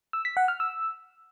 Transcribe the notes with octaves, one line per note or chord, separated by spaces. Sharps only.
E6
B6
F#5
F6
E6